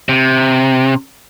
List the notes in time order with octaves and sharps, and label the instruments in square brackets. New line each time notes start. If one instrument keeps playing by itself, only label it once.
[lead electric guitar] C3